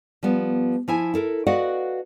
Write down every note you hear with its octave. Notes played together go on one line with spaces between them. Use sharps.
F3 G3 B3
F3 E4 G#5
E4 A4 A#4
F#4 B4 D5 D#5 F5 F#5